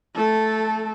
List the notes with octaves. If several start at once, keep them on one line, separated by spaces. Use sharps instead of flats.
A3 A4